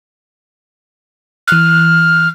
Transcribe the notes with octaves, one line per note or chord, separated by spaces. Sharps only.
E3 F6 F#6